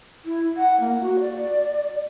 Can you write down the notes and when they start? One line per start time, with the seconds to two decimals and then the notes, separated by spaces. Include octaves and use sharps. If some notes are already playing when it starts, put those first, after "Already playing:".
0.25 E4
0.57 F#5
0.80 A#3
1.01 F#4
1.20 D5